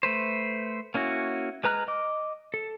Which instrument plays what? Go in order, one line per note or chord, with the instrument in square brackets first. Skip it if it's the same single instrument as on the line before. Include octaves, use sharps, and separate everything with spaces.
[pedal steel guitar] A3 B4 C5
A#3 C#4 E4 F#4
G#3 B4 A#5 F6 F#6
D#5 D6
A4